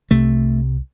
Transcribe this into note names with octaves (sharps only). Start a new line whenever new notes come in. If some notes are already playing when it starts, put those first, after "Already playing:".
C2 C3 A3